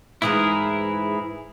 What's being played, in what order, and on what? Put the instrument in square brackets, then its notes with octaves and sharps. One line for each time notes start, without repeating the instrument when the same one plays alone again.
[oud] G#2 E3 F4 [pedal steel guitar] E4 G#4 A#4